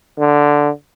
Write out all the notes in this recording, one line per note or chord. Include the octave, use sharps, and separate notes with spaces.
D3